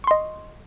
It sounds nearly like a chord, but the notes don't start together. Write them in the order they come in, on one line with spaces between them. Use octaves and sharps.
C#6 C6 D#5